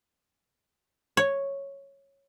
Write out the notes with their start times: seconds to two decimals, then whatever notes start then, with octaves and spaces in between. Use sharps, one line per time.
1.17 C#5